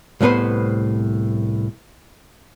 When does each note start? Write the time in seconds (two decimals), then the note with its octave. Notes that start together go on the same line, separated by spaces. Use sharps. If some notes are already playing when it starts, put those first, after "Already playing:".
0.21 C2 A2 B3 B4 C5